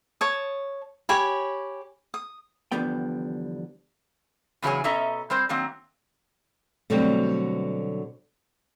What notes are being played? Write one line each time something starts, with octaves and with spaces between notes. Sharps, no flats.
C#5 A5 D#6
G4 C#5 G#5 B5
D#6
E2 D3 F3 G3 B3 G5
E2 C#3 F#3 G#4 C#5 G#5
B2 C#4 A4 D#5 E5 A#5
G3 C4 C5
D#3 F#3 A#3 C4
B2 D3 F#3 G3 A3 C4